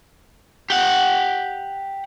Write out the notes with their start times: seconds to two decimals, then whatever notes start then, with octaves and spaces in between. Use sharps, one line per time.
0.70 G4 F#5